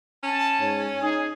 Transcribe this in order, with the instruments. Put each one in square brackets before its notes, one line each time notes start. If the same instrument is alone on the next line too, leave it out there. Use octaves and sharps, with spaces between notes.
[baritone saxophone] C#4 [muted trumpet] A5
[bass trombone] G#2 [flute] C#5
[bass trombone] D#4 [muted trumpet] G#4